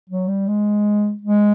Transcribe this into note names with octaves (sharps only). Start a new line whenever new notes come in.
F#3
G3
G#3
G#3